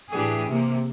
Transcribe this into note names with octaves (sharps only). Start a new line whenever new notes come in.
A2 E3 D4 G4 G#4
C3 A#3